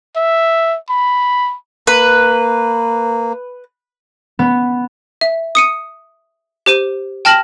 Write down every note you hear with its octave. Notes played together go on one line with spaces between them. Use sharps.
E5
B5
A#3 B4
B3
E5
D#6 C#7 D#7
G4 C5 D#7
G5 A5 F6 A#6 E7 F#7